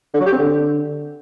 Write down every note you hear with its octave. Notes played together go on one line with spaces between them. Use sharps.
D3
F#3
G4
C4
D3